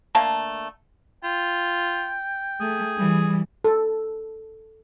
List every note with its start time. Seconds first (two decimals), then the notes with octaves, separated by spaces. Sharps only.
0.15 D3 A3 A#3 A5
1.24 F4 G5
2.61 A3 G#4
2.97 E3 G3
3.64 A4